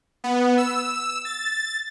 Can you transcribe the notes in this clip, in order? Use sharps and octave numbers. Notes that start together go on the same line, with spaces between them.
B3
E6
A6